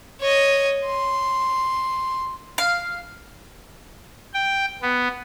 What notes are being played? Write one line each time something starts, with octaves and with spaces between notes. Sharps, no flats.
C#5 D#5
C6
F5
G5
B3